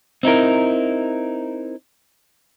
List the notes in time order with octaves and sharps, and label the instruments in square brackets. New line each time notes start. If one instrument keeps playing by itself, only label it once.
[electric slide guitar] C4 D#4 E4 A#4